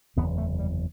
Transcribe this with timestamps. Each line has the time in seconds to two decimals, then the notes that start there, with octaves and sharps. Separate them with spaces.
0.16 F#1 E2 C3 B3
0.38 A3
0.59 G3